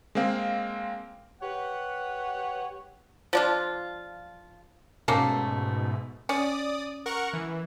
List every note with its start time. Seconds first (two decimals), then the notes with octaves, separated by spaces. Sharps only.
0.15 G#3 A#3 C4 F5
1.42 G4 B4 C#5 F#5
3.33 F3 D4 F4
5.08 G#2 B2 A3 A#3 C#4
6.29 C#4 D5 D#6
7.06 A#4 F#5 C#6
7.33 E3